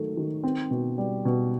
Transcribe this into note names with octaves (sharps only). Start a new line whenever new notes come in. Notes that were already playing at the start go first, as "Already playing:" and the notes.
Already playing: D#3 F#3 A3
D#3
C4
B2
G3
B2